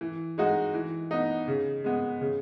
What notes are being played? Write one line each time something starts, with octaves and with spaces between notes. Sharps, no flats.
E3
G#3 D#4 F#4
E3
B3 D#4
C#3
G#3 B3
C#3